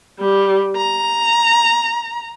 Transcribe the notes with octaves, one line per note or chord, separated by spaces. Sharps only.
G3
A#5